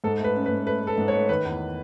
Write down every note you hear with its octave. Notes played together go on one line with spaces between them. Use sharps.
G#2 A4
A3 B4
C#4
B4
G#2
A3 B4
A3
A4
G#2
C#5
A3
D#3 B4
E2